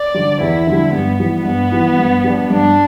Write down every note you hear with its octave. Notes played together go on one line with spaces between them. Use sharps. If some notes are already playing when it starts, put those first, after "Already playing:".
Already playing: D5
D3 G3
E2 E4
D3 G3
G2 B3
E3 G3
G2 B3
E3 G3
G2
G3 D4 G4 D5
G2 D4